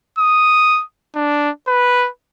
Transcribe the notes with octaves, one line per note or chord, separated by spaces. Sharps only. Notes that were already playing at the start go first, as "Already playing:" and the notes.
D#6
D4
B4